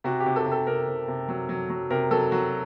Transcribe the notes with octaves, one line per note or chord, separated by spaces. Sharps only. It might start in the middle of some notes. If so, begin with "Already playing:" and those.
C3 F#4
G4
C3
A4
C3
A4
C3 A#4
C3
C3
F#3
F#3
F#3
C3 A#4
F#3 A4
F#3 F#4